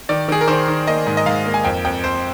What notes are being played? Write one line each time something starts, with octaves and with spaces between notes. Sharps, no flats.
D#3 D5
D#3 G#4
A#4
D#3 C5
D#3
A#3 D#5
G#2
D#5
G#2 F5
A#3
G#5
F2 G5
F2 G5
F2 C5